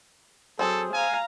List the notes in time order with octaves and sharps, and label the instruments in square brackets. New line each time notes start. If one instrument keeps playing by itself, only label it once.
[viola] F#3 [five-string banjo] C4 G#4 [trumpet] A4
[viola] F5 A#5 [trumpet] G#5